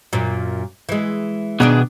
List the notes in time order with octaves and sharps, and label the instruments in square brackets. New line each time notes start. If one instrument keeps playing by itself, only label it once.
[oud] F#2 A#2
E3 G#3
[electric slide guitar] B2 B3 G#4 [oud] D#3 D4 D5